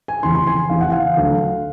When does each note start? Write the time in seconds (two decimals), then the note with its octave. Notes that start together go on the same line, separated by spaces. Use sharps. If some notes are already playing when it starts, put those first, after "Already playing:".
0.08 G#5
0.23 F1 E2 C#3 E3 C6
0.36 C6
0.47 G#5
0.70 F1 E2 C#3 E3 F5
0.81 F#5
0.92 F5
1.17 D2 D3 F#3